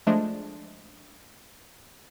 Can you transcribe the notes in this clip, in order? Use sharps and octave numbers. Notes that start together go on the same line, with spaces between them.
F3 G#3 A3 D4